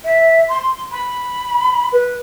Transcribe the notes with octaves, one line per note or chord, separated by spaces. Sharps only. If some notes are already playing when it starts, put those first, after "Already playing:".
E5
C6
B5
B4